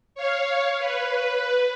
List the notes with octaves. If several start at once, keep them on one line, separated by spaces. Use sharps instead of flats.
C#5 F5
B4